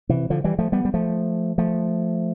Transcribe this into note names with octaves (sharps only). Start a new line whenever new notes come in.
C3 E3
D3 F3
E3 G3
F3 A3
G3 B3
G3
F3 A3
F3 A3